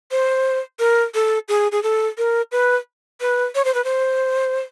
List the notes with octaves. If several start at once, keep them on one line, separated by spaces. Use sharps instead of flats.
C5
A#4
A4
G#4
G#4
A4
A#4
B4
B4
C#5
C5
B4
C5